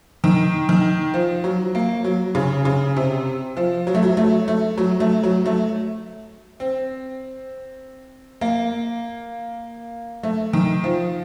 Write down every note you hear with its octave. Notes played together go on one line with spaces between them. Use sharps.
D#3
D#3
F3
F#3
A#3
F#3
C#3
C#3
C3
F3
F#3
A3
F#3
A3
A3
F#3
A3
F#3
A3
C4
A#3
A3
D#3
F3